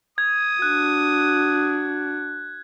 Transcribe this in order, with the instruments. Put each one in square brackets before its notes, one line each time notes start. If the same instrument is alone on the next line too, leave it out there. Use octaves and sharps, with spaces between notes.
[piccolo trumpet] D#6 [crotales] G#6
[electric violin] D4 F#4 [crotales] F#6